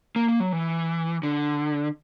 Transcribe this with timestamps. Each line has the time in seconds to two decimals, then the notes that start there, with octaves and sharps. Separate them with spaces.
0.16 A#3
0.28 A#3
0.40 F#3
0.52 E3
1.23 D3